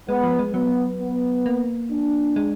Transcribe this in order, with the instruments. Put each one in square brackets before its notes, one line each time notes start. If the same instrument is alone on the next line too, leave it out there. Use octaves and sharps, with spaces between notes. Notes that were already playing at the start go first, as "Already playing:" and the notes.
[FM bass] G#3 [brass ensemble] B3
[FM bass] F3
G#3
[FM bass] F#3 [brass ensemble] B3
[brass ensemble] B3
[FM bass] A#3
[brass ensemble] D4
[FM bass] G#3